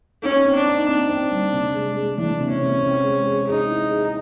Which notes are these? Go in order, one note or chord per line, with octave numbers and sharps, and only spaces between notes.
C#4 D#4
C4
D4
D#4
C4 D4
C4
G3
C3
G#3
G#3
E3 D4
C3
C#4
C3
C4
G#3
G#4
D#4 G#4
E4
G#4